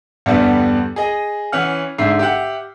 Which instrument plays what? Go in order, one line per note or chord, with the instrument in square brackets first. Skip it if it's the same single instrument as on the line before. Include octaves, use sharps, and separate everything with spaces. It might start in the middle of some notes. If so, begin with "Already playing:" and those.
[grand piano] E2 G2 D3 G3 B3
G#4 D#5
E3 C#4 F#5 F6
G#2 D3 E5 C7
G4 E5 F#5